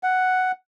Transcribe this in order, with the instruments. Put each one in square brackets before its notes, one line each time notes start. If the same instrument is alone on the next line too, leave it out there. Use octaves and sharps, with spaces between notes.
[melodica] F#5